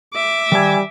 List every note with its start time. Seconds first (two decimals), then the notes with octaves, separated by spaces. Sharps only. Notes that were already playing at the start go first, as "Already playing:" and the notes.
0.14 E5 D6
0.52 D#3 G3 G#5